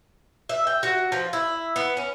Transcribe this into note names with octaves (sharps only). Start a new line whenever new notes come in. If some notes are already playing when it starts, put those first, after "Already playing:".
E5
G5
F#4
F3
E4
B3
C#4